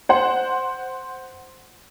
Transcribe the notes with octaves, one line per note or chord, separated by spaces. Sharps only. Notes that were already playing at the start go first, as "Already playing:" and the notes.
C5 F#5